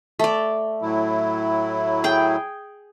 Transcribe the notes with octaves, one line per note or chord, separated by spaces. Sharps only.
A3 D5
A2 F#3 E4
G#4 G5